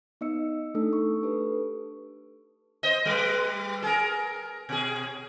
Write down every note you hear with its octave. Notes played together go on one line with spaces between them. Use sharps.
B3 D#4 D#5 E6 C#7
A3 D4 D#4 A4 E6
C#6
D4 G4 A4 B4
C5 D#5
G3 B4
G#4 A#4
B2 G#4